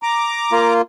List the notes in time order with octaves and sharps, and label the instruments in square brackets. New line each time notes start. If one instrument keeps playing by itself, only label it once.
[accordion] A#5 D6
[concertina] A#3 F4